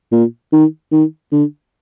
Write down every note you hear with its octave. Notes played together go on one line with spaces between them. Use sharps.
A#2
D#3
D#3
D3